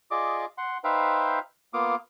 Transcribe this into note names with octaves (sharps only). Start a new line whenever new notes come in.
F4 G#4 D5 D#5 D6
F#5 C6
D#4 B4 C5 E5 F5 G5
A#3 B3 F4 F5 D6 D#6